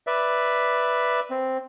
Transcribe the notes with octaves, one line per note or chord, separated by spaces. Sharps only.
B4 D5 E5
C4